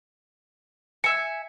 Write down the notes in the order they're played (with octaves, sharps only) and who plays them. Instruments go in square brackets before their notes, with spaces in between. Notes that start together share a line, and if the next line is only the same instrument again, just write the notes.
[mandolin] E5 G#5 [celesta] C#7